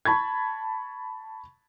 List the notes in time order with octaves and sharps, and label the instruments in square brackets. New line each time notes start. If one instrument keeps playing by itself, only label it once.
[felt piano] A5 B5 C#6 G#6